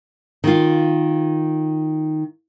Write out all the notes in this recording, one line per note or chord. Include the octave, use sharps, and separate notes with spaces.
D#3 F4